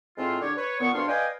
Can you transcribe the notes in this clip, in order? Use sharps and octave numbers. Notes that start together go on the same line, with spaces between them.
A2 G#3 C4 F4
D3 G4 C#5
B4 C#5
A#2 B3 C#6
D2 G2 D4 C#5 F5 C6
B4 D5 D#5 F5 G5 G#5